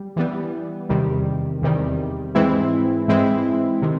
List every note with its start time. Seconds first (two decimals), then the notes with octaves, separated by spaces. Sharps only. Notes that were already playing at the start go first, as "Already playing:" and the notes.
Already playing: G3
0.16 E3 G3 B3
0.89 E2 C3 D#3 G3
1.62 E2 C3 D#3 G3
2.35 G#2 E3 G#3 C4 E4
3.08 G#2 E3 G#3 C4 E4
3.82 C3 D#3